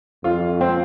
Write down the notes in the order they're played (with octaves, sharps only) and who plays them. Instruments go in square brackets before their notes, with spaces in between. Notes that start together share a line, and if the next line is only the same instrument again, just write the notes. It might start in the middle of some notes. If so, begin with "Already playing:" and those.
[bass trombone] F2 [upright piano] F4
[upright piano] C4